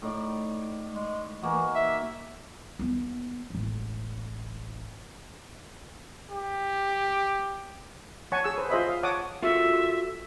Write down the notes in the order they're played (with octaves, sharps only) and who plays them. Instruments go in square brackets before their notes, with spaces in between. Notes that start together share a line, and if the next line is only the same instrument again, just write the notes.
[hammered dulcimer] A2 D#4 D5
[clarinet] G#3
[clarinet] E3 [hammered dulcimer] A#3 D#4 F#4
[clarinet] E5
[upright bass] D#2 B3
E1 A1
[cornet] G4
[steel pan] C#5 F#5 G#5 A5 C#6
G#4 E6
B4 C5
F4 G#4 C5 D#5 E5 B5
F5
C#5 F#5 A5 D6 D#6
[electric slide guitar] F4 F#4 A4 [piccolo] E5